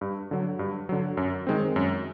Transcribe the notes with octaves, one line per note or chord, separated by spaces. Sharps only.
G2
D3 F#3
G2
D3 F#3
F#2
D#3 G#3 C4
F#2